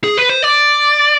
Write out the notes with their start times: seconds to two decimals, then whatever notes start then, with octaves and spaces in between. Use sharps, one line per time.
0.04 G#4
0.17 B4
0.29 C5
0.43 D5